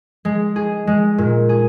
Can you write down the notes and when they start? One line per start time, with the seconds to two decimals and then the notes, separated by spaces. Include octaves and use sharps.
0.25 G#3
0.56 G#4
0.87 G#3
1.18 A#2
1.49 G#4